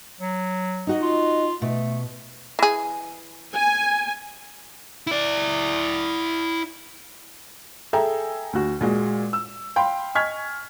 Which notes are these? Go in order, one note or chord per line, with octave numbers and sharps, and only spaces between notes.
F#3
D#4 F#4 D#5
F4
B2 A3
E3 G#4
G#5
E4 D5
G#4 A4 E5 G5 G#5 A#5
D2 F#4
A#2 G#3 F#4
E6
F5 G5 B5 C6
D#5 G#5 C#6 F6 G#6 B6